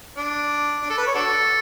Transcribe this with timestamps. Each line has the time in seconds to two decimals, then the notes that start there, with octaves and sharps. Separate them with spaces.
0.17 D4
0.82 D4
0.90 A4
0.98 B4
1.06 C#5
1.14 D4 F#4 A4